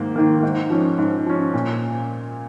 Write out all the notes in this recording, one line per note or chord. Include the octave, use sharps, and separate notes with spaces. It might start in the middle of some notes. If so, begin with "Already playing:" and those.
Already playing: G#2 D#3 A#3
D#3 A#3
G#2
F3 C#4
G#2
F3 C#4
A#2